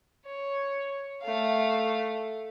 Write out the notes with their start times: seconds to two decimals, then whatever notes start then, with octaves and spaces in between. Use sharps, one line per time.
0.26 C#5
1.22 A3 F5